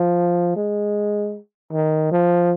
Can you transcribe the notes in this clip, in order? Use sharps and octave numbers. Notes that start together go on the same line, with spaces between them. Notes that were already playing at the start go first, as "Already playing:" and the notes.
Already playing: F3
G#3
D#3
F3